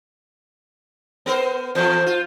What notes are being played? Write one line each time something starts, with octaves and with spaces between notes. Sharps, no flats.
B3 A#4 C5
E2 F3 C5
F4